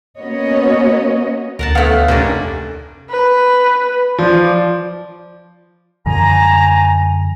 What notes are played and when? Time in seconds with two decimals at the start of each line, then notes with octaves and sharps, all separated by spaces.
0.17 A#3 B3 C#4 F#4 C#5 D#5
1.59 D2 A#4 F#5 A5
1.75 A3 B3 C#5 F5 F#5
2.08 F1 A#3 C#4 D4
3.10 B4
4.18 F3 D5
6.06 F#2 D3 F3 G#5 A#5